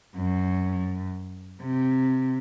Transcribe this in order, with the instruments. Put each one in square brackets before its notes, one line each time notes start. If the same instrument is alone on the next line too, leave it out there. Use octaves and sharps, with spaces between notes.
[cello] F#2
C3